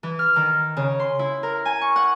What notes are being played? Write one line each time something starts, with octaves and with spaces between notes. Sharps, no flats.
E3
F6
D#3
C#3
C6
E4
A#4
G#5
C#6
F#5